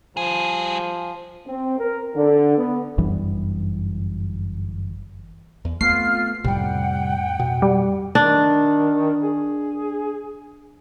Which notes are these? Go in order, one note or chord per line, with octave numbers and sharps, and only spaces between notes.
F3 G3 G#4
C4
A#4
D3
B3
G1 F#2 E3 G3
E2
A3 B3 C4 F4 F6 C7
F2 A2 C3 G3 F#5 G5
B2
G3
D#3 D4
G#4